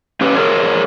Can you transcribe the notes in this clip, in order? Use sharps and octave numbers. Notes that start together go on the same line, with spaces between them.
C#4 G4 B4
D4 G#4 A#4 C5 C#5